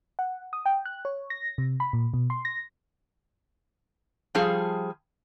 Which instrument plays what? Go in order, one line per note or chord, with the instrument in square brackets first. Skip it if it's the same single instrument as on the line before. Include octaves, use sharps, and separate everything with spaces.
[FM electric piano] F#5
D#6
G5
F#6
C#5
A#6
C3
B5
A#2
B2
C6
A#6
[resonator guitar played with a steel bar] F3 G3 F4 G#4